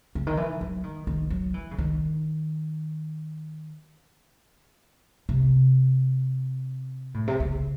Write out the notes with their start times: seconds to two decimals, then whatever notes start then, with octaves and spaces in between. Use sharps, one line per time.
0.15 C#3
0.27 D#3
0.37 E3
0.61 F#3
0.84 D#3
1.07 D#3
1.30 F#3
1.54 E3
1.71 C#3
1.78 D#3
5.29 C3
7.14 A2
7.27 C3
7.40 C#3